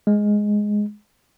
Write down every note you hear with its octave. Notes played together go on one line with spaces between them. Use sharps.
G#3